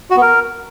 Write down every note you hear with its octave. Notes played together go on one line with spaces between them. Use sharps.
F#4
B3
A#4